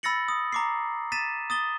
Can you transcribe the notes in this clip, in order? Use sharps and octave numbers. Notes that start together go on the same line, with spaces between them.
B5 E6 A6 A#6 C#7 F#7
D#6
A#5 D6 C7
A6 B6 D#7 E7
D#6 A6 G7